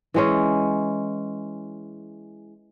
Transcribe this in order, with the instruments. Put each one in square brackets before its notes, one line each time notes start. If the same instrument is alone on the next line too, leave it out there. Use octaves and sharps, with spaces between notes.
[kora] E3 G#3 C#4